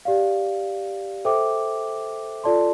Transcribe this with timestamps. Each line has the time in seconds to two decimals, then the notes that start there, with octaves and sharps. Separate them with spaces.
0.05 G4 D5 F5
1.25 A4 C5 E5 G5 D6
2.44 F4 A4 D5 A5 C6